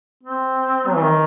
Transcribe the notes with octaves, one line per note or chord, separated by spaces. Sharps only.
C4
F#3
E3
D#3